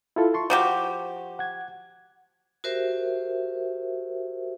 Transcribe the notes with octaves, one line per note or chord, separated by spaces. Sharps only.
E4 F4 A4
A5 C6 C#6
F3 F#4 G4
F#5 G#6
F#4 G4 A#4 C5 E5